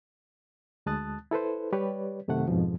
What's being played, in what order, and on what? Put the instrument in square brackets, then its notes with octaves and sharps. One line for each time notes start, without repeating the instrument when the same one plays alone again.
[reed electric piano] D2 G#3 A5 D#6 F#6 A6
E4 A4 B4 C5
G3 G4 B4 C#5 D5
F#2 C3 D#3 A3 F#5
F2 G#2 B2 F3